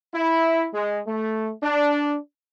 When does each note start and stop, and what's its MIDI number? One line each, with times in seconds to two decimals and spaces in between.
0.14 0.67 64
0.74 1.00 56
1.07 1.52 57
1.63 2.18 62